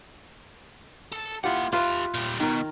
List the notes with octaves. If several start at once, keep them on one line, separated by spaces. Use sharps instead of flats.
A4
A#3 E4 F4 G4 F#5
F4 G4 B4 E5 F5
A#2 G3
B2 D#3 A#4